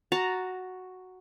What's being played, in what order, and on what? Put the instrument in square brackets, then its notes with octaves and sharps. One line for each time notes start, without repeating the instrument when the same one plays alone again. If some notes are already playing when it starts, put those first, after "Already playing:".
[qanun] F#4 A5 A#5